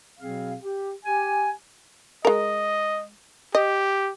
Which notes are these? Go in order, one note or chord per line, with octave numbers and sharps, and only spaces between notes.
B2 F#3 C4 G#4 F5
G4
G4 G#5
G#3 A#4 D#5
G4 D#5